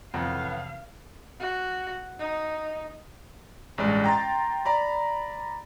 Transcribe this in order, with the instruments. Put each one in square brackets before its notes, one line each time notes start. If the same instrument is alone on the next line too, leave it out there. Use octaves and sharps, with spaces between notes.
[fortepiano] F2 [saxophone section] A2 B3 [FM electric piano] C3 D#3 E3 [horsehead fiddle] F5
[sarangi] F#4
D#4
[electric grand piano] A1 G2 G#3 D5
G5 A#5 C6 A6
D5 A#5 B5